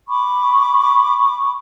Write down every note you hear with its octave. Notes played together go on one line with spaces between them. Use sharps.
B5 C#6 D6